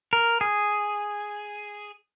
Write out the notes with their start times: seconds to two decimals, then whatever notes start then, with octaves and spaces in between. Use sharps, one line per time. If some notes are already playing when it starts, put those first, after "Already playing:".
0.13 A#4
0.41 G#4